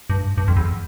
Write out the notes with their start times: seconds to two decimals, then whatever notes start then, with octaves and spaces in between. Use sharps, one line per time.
0.10 G2
0.38 G2
0.48 F2
0.57 E2